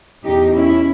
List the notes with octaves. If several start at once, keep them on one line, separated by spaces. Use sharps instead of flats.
E2 B2 D#4 G4
C#4 E4